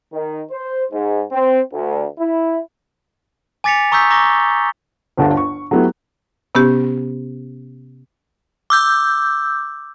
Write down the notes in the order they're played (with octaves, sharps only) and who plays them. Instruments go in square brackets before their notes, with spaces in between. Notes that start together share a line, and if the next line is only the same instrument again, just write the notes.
[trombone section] D#3
C5
G#2
C4
D2
E4
[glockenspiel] G#5 D6 A6 B6 C#7 F7
A#5 C#6 D#6 E6 G6 B6
A#5 C#6 D6 E6 A#6 G7
[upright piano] G1 D2 G2 D3 A5
C#6
F#3 A3 B3 E4 G4
[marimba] C3 B3 C#4 G4
[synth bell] D6 E6 G6